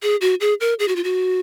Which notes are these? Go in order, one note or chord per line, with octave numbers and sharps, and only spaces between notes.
G#4
F#4
G#4
A#4
G#4
F#4
F4
F#4